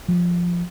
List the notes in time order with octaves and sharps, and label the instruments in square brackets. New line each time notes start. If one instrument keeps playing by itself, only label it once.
[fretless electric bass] F3